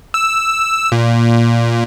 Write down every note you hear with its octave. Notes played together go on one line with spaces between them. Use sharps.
E6
A#2